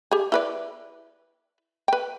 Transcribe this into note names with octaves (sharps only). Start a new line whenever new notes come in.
G4 G#4
E4 B4 D5
B4 G5